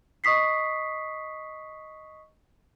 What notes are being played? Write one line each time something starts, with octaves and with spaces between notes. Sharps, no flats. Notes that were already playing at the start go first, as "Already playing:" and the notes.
D#5 C#6 D#6 B6 C7